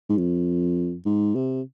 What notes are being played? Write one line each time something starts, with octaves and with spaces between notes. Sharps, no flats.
G#2
F2
G#2
C3